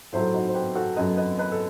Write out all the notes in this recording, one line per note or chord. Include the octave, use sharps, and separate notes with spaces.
A2 F#3 A3 C5 E5
D#4 F#4
C5
G4 B4
F#4 A4
F#2 F#3 A3 B4 D#5
B4 D#5
B4 D#5
A4